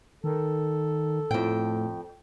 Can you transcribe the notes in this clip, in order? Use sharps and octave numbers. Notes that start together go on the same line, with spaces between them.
D#3 A4
F2 A2 G5